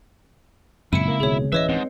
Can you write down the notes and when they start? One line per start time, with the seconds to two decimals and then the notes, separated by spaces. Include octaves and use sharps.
0.93 F#2 A#2 C#3 G#3 C4 E4 C#7 D#7
1.08 A#3
1.20 D1 B2 D#3 G#4 C#5
1.52 D1 E3 C#4 B4 C#5 D#5 E5
1.69 G#2 C4